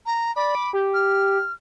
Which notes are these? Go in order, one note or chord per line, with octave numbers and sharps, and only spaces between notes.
A#5
D5 B5
D6
G4
F6